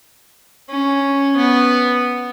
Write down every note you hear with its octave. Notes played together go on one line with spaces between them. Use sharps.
C#4
B3